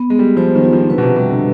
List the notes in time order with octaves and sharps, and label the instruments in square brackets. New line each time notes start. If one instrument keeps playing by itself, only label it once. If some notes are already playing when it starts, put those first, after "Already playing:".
Already playing: [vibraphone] B3
[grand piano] G#3 [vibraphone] B3
[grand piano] G3
[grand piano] F3 [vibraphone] C5
[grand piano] D#3
[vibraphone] F4
[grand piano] F3
D#3
[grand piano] D3 [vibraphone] B4
[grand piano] B2
C3
[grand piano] C3 [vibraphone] G3
[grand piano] D3